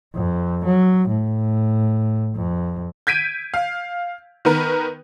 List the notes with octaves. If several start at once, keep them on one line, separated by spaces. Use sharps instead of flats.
F2
F#3
A2
F2
G6 G#6 B6 D7 D#7
F5
D#3 B3 A#4 B4